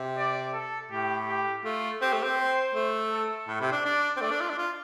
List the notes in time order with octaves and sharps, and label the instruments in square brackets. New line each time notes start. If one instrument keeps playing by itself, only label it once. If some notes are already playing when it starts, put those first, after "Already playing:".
Already playing: [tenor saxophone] C3
[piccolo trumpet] D5
A4
[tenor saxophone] A2 [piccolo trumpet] G4
[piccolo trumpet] G4
[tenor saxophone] A3 [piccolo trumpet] F4
[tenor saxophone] C4 [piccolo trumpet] G4
[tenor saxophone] A3
C4
[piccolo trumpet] C5
[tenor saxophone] A3
[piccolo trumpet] A4
[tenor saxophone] A2
C3
D4
[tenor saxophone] D4 [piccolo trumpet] D5
[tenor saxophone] C4
[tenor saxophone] A3 [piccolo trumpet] D5
[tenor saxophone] D4
F4
D4
F4